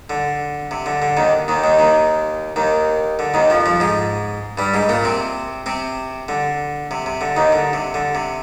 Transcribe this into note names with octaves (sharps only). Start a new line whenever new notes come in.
D3
C3
D3
D3
D#2 D#3
D#2 D#3
D#2 D#3
D#2 D#3
D#2 D#3
D3
D#2 D#3
F2 F3
F2 F3
G#2 G#3
G2 G3
G#2 G#3
A#2 A#3
C3 C4
C3 C4
D3
C3
C3
D3
D#2 D#3
D3
C3
D3
C3